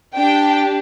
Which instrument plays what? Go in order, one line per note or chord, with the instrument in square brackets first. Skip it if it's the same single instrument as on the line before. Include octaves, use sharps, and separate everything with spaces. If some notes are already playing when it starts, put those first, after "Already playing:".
[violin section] D4 G4 G5